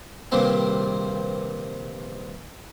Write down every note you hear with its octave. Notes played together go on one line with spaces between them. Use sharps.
A#1 G2 C3 D#3 A#3 C4